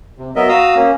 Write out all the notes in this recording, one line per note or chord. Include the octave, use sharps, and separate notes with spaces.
C3
F#3 B3 A#4 D#5 E5
F#4 F5 A#5 D#6 E6
A#3 C#4